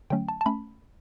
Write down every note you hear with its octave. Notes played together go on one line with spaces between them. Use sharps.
D3 F#3 A3 C#4 G5
A5
A5
A3 C#4 B5